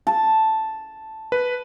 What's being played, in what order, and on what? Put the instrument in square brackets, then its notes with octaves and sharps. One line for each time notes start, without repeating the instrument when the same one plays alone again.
[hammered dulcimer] A5
[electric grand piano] B4